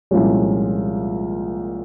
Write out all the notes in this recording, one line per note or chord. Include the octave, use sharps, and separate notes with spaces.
C2 A#2 F3 G#3 C#4